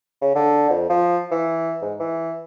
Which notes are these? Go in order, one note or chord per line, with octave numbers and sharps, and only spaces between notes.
C#3
D3
F2
F3
E3
G#2
E3